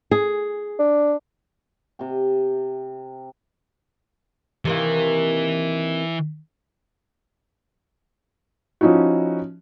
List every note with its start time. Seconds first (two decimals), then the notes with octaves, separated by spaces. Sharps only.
0.11 G#4
0.79 D4
1.99 C3 G5
4.65 C3 D#3 E3 A#3
8.81 F3 C#4 D#4 E4 F#4